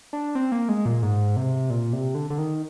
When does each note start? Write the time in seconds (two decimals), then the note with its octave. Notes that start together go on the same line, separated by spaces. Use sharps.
0.13 D4
0.35 C4
0.52 A#3
0.69 G#3
0.86 A#2
1.03 G#2
1.37 C3
1.70 A#2
1.93 C3
2.15 D3
2.30 D3
2.38 D#3